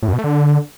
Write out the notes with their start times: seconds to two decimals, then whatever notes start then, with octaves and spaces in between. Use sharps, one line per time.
0.02 A2
0.08 F#2
0.13 B2
0.19 A3
0.24 D3